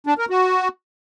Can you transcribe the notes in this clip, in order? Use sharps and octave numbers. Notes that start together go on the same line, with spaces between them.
D4
A#4
F#4